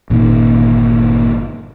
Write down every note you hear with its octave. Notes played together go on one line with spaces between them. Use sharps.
G1 A#2 D#3